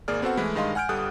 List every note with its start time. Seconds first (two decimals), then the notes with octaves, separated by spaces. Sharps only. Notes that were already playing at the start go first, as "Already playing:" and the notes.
0.08 G#1 A#3 G#4 D5 F6
0.22 B3 C4 F#4 A4 C5 F#5
0.37 E3 G#3 A3 E4
0.55 G2 D#3 G#3 D#5 F5 C6
0.75 F#5 G#5 F6 G6 D7
0.89 G1 G3 A4 F#5 D#6 F#6